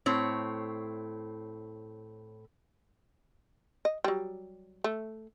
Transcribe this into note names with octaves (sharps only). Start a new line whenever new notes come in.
A2 C4 C#5
D#5
F#3 G3
A3